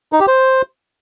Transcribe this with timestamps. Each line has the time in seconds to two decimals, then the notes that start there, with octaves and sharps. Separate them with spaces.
0.13 D#4
0.20 G4
0.28 C5